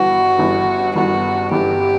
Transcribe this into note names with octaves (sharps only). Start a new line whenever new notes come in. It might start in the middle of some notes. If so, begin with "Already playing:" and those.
Already playing: G1 G2 E3 B3 F#4
G1 G2 E3 B3
G1 G2 E3 B3 F#4
G1 G2 E3 B3 G4